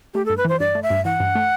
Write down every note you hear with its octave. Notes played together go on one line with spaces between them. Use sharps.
A3 G4
G2 A4
B4
E3 C5
G2 D5
A3
E5
G2
E3 F#5
G2
A3